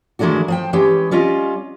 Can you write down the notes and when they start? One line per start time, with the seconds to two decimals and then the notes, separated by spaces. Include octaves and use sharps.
0.19 D#3 E3 G#3 A3 D4 F#4
0.48 F3 C5 G5
0.73 E3 G#3 C#4 G4
1.11 G3 C#4 F4 D#5